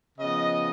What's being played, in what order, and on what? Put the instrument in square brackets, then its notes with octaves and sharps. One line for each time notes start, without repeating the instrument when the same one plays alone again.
[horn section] C#3 F3 B3 D#5